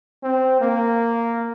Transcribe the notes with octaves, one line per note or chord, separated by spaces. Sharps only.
C4
A#3